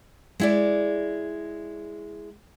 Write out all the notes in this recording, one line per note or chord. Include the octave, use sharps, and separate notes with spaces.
G#3 E4 D5